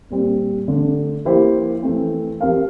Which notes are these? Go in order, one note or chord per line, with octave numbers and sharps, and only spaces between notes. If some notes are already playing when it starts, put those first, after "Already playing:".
A#2 G3 C4
D3 A3 D4
F3 A#3 E4 G4 C5
E3 A3 C4
F3 C4 G4 A#4 F5